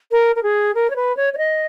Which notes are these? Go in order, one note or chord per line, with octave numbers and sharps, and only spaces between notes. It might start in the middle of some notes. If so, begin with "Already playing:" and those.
A#4
A#4
G#4
A#4
C#5
B4
C#5
C#5
D#5